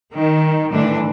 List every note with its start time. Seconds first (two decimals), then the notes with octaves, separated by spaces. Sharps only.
0.12 D#3
0.71 A2 D3 E3 D4